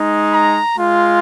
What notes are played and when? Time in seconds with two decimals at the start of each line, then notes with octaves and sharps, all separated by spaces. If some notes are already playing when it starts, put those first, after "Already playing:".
Already playing: G#3 D#4
0.34 A#5
0.78 G#3 F4